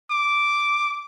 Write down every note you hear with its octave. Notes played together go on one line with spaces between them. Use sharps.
D6